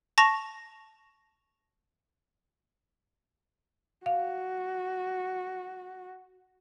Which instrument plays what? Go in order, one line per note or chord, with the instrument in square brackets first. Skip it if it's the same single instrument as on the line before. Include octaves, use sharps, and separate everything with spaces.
[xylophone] A5 C#6 A#6 F7
[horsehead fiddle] F#4 [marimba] F5